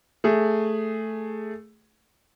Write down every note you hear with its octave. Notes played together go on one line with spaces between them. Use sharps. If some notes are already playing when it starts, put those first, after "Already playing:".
A3 G#4